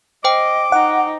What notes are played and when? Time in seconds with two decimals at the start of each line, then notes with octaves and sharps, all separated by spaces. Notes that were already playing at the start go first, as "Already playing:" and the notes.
0.24 C5 D#5 G5 D6
0.72 D#4 F#5